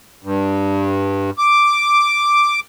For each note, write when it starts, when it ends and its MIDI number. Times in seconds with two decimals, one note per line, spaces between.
0.24 1.31 43
1.38 2.60 86